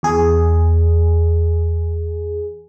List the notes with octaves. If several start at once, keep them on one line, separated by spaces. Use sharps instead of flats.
E2 G#4